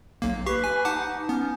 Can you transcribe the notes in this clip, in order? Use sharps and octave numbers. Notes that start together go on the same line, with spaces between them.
B1 A#3
G4 B4 C#6 C7
G#5
D#4 F#5 A5 D6
B3 C#4